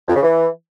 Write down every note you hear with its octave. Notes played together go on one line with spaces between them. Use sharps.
F2
C#3
E3